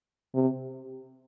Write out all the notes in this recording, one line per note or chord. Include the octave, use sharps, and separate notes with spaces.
C3